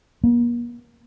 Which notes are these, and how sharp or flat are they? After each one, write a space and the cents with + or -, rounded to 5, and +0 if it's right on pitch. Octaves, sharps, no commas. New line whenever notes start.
A#3 +40